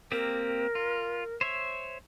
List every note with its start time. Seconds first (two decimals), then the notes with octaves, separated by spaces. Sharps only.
0.12 A#3 C4 G4 A#4
0.75 F4
1.41 C5 C#5 E5